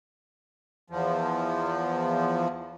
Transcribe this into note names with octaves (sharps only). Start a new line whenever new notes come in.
E2 F3